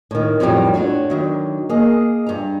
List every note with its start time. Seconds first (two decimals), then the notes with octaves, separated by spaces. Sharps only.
0.11 A2 D#3
0.40 F2 A2 D#3 F#3 G3
0.74 A3 D4 F#4 C#5
1.10 D3 D#3 F#3
1.69 A#3 G#4 D#5
2.26 G2 A#5